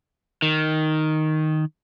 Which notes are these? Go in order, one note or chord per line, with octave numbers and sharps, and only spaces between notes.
D#3